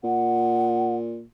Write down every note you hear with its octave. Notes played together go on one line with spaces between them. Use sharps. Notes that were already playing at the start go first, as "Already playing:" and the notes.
A#2 F#5